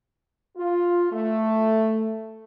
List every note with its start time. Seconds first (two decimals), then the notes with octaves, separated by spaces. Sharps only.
0.57 F4
1.10 A3